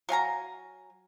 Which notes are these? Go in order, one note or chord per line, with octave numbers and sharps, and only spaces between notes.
F#3 F5 G#5 A#5